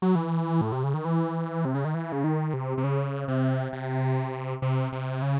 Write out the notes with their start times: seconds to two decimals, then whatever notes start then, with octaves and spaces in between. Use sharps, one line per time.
0.02 F#3
0.15 E3
0.61 A2
0.72 C3
0.83 C#3
0.94 D#3
1.05 E3
1.65 C3
1.75 C#3
1.85 D#3
1.94 E3
2.12 C#3
2.24 D#3
2.53 C3
2.78 C3
2.84 C#3
3.28 C3
3.73 C3
4.62 C3
4.92 C3
5.22 C#3